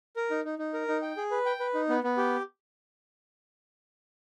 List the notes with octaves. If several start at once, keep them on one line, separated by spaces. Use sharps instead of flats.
A#4
D#4
D#4
D#4
A#4
D#4
G5
G#4
B4
G5
B4
D#4
B3
B3
G4